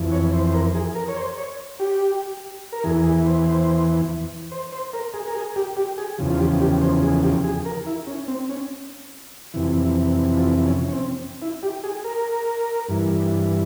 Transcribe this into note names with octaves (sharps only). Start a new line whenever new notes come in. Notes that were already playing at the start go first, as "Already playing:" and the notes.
Already playing: F2 E3
C#5
C5
C5
A#4
G#4
A#4
C#5
C5
C#5
G4
A#4
E2 E3 G#4
G#4
C5
C5
C5
C5
A#4
G#4
A#4
G#4
G4
G4
G#4
E2 C#3 F3
F4
G4
G4
C5
G#4
G4
G#4
A#4
E4
C#4
C4
C#4
F2 C3 E3
F4
C#4
C#4
C4
E4
G4
G#4
A#4
G2 E3